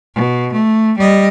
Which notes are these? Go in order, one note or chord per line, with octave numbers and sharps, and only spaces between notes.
B2
A3
G3 D#5